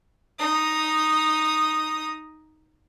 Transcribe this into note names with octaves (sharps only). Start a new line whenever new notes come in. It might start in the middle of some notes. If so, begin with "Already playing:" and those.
D#4 D#6